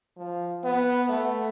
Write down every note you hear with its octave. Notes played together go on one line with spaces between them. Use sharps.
F3
B3
A3